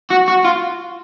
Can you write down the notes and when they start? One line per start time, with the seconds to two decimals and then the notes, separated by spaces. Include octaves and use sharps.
0.10 F#4
0.28 F#4
0.44 F4